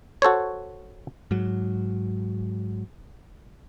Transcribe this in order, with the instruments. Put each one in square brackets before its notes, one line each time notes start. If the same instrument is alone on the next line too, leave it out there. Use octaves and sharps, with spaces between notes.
[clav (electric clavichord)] F#4 A4 C5 C#5
[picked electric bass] G#2 F#3